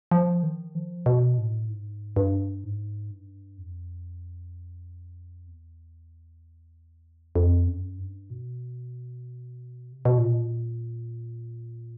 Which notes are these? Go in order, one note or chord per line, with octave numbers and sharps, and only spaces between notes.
F3
D#3
F3
B2
A2
G#2
G2
G#2
G2
F2
E2
F2
F#2
G2
B2
C3
B2
A#2